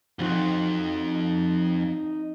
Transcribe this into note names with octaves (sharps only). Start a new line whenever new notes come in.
B1 F2 F3 C4 D#4 F#4